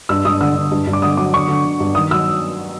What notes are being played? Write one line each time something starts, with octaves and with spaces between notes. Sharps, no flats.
G2 E6
G2 D#6
D3 E6
D3
G2
G2
D6
D3 D#6
F#3 D6
D3 C#6
D3
D3
G2
D#3 D#6
F#3 E6